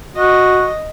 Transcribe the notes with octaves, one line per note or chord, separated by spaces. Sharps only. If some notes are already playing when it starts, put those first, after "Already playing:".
F#4 D#5